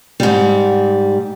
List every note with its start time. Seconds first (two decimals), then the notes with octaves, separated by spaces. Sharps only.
0.20 G#2 G3